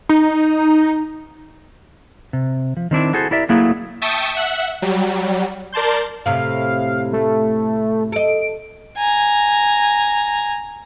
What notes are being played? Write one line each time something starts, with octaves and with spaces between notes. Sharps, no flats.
D#4
C3
F3
D#3 C4 D4 E4
E4 F#4 G#4 A4 C5
E4 G4 A#4 D5 E5
F#3 A3 A#3 E4 G#4
E5 G5 A5 C#6 D#6
E5 F#5 F#6
F#3 G3
A#4 D5 A5 C6 G6
A2 C3 F5
A3
A4 D#5 D7
G#5 A#5